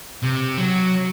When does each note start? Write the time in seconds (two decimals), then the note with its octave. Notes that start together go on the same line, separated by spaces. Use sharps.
0.23 C3
0.58 F#3